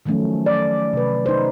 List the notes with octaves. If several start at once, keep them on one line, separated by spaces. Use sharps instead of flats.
D#3 F3 F#3 A3 C#4
D5
C3 B4
D#4 C5